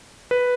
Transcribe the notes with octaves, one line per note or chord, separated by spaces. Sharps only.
B4